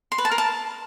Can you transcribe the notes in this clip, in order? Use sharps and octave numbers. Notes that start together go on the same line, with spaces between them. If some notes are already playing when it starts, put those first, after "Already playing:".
C6
B4
A5
A#4
A5